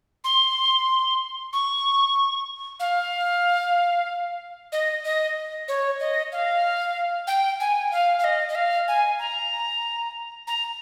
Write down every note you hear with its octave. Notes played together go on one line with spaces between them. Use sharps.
C6
C#6
F5
D#5
D#5
C#5
D#5
F5
G5
G#5
F5
F5
D#5
D#5
F5
G#5
A#5
A#5